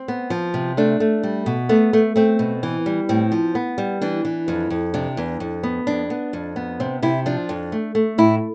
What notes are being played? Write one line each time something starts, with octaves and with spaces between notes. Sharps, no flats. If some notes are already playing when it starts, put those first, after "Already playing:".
Already playing: C4
B3
F3
C3
A3 D4
A3
G3
B2
A3 B3
A3
A3 C4
B2
E3
G3
A2 C4
F3
B3
G3
E3 D4
E3
F2
F2
C3 D4
E2
F2
B3
F2 D4
B3
F2
B3
C3 C4
C3 E4
F3 D4
F2
A3
A3
A2 E4